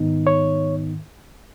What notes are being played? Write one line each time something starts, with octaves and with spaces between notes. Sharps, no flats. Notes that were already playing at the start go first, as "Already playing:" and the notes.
Already playing: G#2 D#3 B3 D#4
C#5